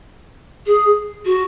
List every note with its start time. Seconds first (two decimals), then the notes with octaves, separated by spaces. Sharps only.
0.66 G#4
1.25 F#4